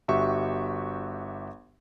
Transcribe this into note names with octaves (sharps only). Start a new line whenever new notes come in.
G1 F#4 G4 E5 C#6